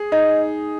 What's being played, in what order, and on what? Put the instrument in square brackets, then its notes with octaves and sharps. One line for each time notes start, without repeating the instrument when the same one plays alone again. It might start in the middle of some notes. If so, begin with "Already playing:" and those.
Already playing: [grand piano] G#4
[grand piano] D#4 [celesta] D#5